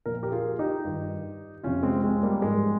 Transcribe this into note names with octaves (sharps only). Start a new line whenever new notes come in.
A#2 F3 A#4
G4 A#4
F4 G#4
D#4 G4
G2 D#3
F2 C3 F3 C#4 F4
G#3 C4
G#3 C4
G3 A#3
G#2 F3 G#3